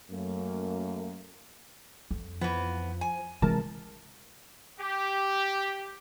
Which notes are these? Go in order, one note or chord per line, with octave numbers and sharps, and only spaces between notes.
F#2 A3 A#3
F2
E3 F3 B3
G#5
C3 E3 G#3 E4 A#4 A5
G4